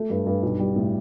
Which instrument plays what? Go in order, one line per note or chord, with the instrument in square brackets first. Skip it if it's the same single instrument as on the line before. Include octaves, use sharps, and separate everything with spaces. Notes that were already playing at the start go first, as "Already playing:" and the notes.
Already playing: [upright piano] A3
G2
G2
B1
G3
A2